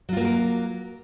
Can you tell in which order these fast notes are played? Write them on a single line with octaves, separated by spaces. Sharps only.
F#3 F4 A#3 F#4 A#4